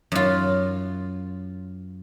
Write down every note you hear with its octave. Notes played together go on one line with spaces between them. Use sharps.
F#2 F4